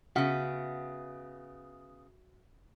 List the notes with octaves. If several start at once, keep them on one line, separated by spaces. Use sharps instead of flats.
C#3 B3 F#4 E5 F#5